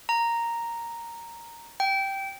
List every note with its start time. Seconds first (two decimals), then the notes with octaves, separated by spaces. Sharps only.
0.09 A#5
1.80 G5